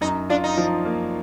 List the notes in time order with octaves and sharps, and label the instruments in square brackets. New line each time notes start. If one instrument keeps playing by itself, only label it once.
[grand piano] F#2 [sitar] D#4
[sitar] D4 [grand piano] F4
[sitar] D#4
[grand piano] F3
A#3